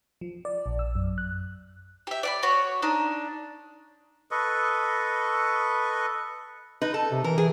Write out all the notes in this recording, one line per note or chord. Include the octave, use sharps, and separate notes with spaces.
F3
D5
A#1
E6
F#2
F#6
G4 E5
D5 F#5 B5
F#4 C#5
D4 D#4
A4 B4 D#5 C#6
D#4 B4
A4
C3
E3 A#4
E3 G#4